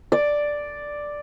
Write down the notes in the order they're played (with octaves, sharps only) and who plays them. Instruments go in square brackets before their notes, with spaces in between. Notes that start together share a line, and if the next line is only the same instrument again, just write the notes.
[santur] D5